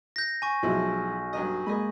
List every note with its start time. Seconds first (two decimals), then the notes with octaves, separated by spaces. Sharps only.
0.16 G6 A#6
0.42 G#5 C#6
0.63 B1 F3 G#3 E4
1.33 G2 F#3 D#5
1.66 G#3 A#3 D#5 G#5 B5